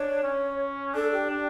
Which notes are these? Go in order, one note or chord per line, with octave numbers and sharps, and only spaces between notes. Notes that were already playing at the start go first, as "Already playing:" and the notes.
Already playing: D4 C#5
C#4
D4 A4
G4
D4